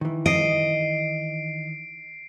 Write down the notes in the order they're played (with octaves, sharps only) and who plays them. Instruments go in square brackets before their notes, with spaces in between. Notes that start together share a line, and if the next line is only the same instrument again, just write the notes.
[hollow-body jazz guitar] D#3 E3
[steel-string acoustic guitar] D#5 [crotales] C7 D7